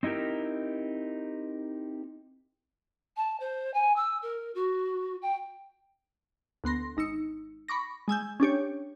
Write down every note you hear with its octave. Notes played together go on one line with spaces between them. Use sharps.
C4 D#4 E4 G4 A#4
A5
C5
G#5
E6
A#4
F#4
G5
D2 B3 C6 A#6
G#1 D#4 E6 C#7
B5 C#6 D6 A#6
G#3 G#5 E6 G6
C#4 D4 G4 C#5